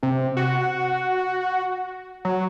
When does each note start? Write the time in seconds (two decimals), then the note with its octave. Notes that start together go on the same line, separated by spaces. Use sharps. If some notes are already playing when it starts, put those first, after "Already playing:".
0.03 C3
0.37 F#4
2.25 F#3